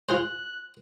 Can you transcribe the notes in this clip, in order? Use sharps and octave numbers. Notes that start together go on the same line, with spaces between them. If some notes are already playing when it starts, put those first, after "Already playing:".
F4 G#4 C5 F#6